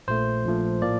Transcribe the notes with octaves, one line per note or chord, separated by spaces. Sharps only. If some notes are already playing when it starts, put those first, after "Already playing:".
A#1 A#2 F3 A3 C5
A#1 A#2 F3 A3
A2 F3 A#3 D5